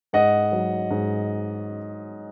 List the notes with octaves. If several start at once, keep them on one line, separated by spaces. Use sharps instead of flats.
G#2 D#5 F#5
F#3
G#2